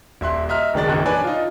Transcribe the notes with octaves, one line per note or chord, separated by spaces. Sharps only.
D#1 E5 C6 F#6
D#5 E5 A#5 F6
D1 D#3 G#3 D4 A6
A#1 F#2 D#3 E3 F#6
D4 B4 C#5 D5 G#5
D#4 F4